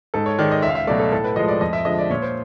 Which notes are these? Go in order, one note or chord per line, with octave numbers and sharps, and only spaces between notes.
G#2 A4
C#5
D#3 G#3 D5
D#5
C#2 E5
F5
E5
B2 F#3 A3 D5
A4
A2 A4
B4
F3 G#3 D#5
D5
F2 D#5
E5
D3 F3 G#3 D#5
D5
A#2 C#5
C5